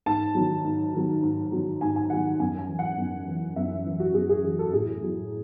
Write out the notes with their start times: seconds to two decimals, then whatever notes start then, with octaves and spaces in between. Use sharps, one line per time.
0.06 G#2 A5
0.35 D#3 F#3
0.64 G#2
0.94 D#3 F#3
1.22 G#2
1.52 D#3 F#3
1.81 G#2 G#5
1.96 G#5
2.10 D#3 F#3 F#5
2.40 F#2 G#5
2.59 G#5
2.69 E3
2.79 F#5
2.98 F#2
3.28 E3
3.56 F#2 E5
3.86 E3
4.00 F#4
4.14 F#2 G#4
4.29 G#4
4.43 E3 G#4
4.59 A4
4.73 A2 G#4
5.02 F#3